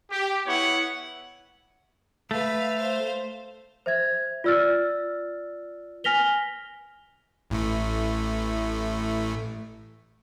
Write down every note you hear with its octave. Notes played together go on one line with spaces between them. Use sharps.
G4
B3 E4 C#5 F#5
A3 B4 F5
C5 F5
C5 E5 G#6
F4 D5 E6 F6 A6
G#5 F6 A#6 B6 F7 G7
A1 A2 A3